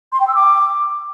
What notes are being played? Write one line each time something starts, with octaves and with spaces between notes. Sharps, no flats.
C6
G5
E6
D6